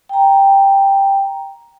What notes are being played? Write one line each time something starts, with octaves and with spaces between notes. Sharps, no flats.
G5 A#5